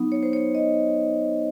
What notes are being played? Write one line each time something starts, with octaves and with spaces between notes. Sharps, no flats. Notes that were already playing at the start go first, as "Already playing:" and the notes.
Already playing: F#3 B3 D#4
C#5
C5
C#5
D#5